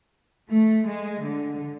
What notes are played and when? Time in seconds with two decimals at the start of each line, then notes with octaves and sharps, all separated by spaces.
0.50 A3
0.87 G#3
1.22 D3